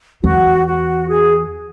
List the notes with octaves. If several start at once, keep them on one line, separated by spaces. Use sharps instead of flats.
E2 F#4
F#4
G#4